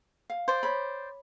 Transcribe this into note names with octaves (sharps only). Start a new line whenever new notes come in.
F5
C5 D5
C#5 B5